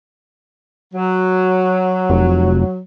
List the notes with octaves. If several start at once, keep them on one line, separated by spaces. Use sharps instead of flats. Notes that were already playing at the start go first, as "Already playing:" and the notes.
F#3
F1